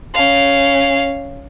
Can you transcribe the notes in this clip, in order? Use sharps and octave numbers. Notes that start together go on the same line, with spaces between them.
C#4 F5